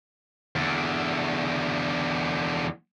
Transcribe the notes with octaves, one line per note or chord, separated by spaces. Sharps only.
E2 D3